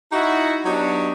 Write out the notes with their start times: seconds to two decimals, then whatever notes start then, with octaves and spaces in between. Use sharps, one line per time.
0.12 D#4 E4 F#4
0.66 F#3 B3 D4 D#4 F#4 G4